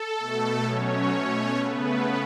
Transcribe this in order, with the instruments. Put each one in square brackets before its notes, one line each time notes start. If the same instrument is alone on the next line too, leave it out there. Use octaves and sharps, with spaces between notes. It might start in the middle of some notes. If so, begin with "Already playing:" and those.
Already playing: [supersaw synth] A4
B2 A3
B2 F#3 A3 C#4 C#5
B2 A3
C#3 A3 B3 B4